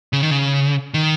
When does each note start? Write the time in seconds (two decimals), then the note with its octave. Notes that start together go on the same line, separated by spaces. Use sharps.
0.13 C#3
0.22 D#3
0.30 C#3
0.94 D#3